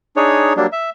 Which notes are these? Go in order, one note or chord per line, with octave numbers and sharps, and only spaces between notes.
D4 D#4 G#4 C#5
F#3 G3 A#3 D4
E5